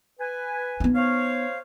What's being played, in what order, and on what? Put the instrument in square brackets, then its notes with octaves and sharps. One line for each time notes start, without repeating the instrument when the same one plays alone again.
[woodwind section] B4 G#5
[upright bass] B3 D#4
[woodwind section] C5 C#5 F5